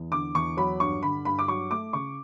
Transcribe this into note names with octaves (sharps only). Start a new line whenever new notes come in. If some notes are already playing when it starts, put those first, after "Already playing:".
Already playing: E2
D3 D6
E2 C#6
F#3 B5
G2 C#6
D3 B5
G2 B5
D6
F#3 C#6
A3 D6
C#3 C#6